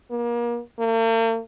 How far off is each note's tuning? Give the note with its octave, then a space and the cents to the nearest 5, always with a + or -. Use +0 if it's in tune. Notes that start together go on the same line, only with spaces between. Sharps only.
A#3 +30
A#3 -45